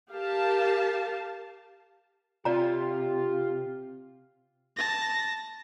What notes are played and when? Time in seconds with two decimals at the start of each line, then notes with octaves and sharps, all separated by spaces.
0.11 G4 A#4 F5 A5
2.45 C3 F4 G4 D5 A#5
4.76 A5 A#6